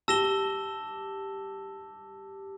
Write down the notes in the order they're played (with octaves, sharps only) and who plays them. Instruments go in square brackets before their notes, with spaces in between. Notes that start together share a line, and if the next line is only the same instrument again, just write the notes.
[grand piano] G4 [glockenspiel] A5 E6 A#6 E7 G7